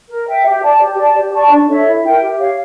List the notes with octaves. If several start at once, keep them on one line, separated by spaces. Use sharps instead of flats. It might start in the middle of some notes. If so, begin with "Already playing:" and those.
A#4
E5 G5
G4
D5 A5
G4
D5 A5
G4
D5 A5 C#6
D4
A4 C#5 E5
E4
A#4 E5 G5
G4
C#5 F5